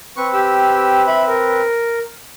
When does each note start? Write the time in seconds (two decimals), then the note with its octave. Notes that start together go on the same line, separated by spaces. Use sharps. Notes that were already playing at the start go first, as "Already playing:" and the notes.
0.16 C4 B4 C#6
0.33 G4 E6
1.07 E5 B5
1.27 A#4